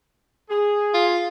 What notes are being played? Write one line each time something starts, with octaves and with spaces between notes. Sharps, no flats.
G#4
F4